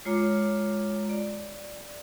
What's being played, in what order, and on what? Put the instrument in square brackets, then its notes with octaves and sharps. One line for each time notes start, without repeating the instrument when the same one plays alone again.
[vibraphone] G#3 F4 C#5 A#5 D6
D5